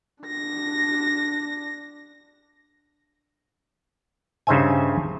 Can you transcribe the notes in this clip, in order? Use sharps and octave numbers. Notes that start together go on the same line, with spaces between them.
D4 A#6
G2 C#3 D#4 C5 E5 G#5